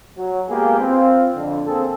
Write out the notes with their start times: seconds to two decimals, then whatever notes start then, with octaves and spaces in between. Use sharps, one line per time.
0.17 F#3
0.49 G#3 A#3 B3 F4 G4 G#4
0.80 C4 F4
1.36 F2 D3
1.65 A#3 C4 G#4 A4